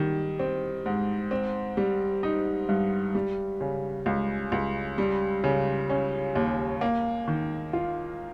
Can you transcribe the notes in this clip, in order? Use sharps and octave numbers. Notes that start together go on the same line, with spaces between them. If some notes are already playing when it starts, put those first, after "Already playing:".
Already playing: D#3 G3
C4
G#2
C4
G3
D#4
G2
G3
C#3
C#2
C#2
G3
C#3
C#4
D#2
A#3
D#3
F4